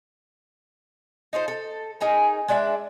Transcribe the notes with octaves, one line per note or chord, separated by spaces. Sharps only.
D#4 F4 A4 C5
A4
C#4 D#4 G#4 A#4
G#3 D4 D5 E5